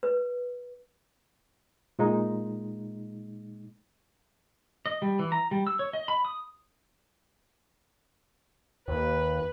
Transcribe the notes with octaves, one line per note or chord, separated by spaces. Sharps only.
B4
A#2 G#3 D#4
D#5
G3
E3
A#5
G3
E6
C#5
D#5
B5
D#6
D#2 B4